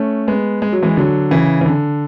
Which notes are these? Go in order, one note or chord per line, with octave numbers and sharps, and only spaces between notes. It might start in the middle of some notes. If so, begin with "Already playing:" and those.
Already playing: A3 C#4
G#3 B3
G#3
F#3
E3 G#3
D3 F#3
C#3 E3
E3
D3